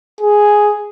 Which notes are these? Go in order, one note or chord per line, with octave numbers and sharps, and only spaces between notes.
G#4